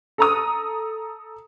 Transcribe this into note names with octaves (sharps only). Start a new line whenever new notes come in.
A4 A#5 D#6